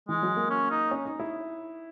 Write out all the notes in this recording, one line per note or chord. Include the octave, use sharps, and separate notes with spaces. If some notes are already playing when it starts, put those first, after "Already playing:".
E3 G#3
F#3
A#3
C#4
D#4
C#4
D#4
E4